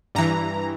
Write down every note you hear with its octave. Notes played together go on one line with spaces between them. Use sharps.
G2 E3 A#5